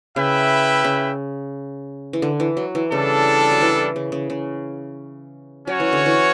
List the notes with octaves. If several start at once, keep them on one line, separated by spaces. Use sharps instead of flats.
C#3 E4 B4 E5 G5
C#3
E3
D3
E3
F#3
E3
C#3 G3 D4 A4
F#3
E3
C#3
C#3
C#3
F#3 C#4 F#4 C#5
E3
D3
E3